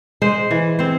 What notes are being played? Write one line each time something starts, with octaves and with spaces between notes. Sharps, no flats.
G#3 C5
E3
C4 C5